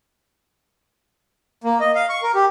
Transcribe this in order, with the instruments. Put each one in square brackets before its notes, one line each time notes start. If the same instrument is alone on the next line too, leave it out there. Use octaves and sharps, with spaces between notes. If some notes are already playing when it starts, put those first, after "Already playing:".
[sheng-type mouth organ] A#3
D#5
F5
C#6
A#4
G4